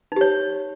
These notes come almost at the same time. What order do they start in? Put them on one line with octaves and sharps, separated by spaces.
D#4 G4 C#5